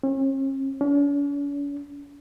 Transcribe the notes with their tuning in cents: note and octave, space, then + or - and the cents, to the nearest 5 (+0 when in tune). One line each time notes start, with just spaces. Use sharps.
C#4 -45
C#4 +45